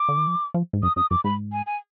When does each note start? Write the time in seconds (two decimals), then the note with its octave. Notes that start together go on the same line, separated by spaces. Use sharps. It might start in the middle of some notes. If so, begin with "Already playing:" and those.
Already playing: D6
0.08 D3
0.17 D#3
0.27 F3
0.54 F3
0.73 G#2
0.83 F#2 D#6
0.96 F#2 D#6
1.11 F#2 D6
1.24 G#2 B5
1.52 G#5
1.66 G#5